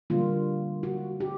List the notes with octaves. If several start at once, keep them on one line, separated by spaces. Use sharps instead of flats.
D3 G3 A#3 F4
F#4
G4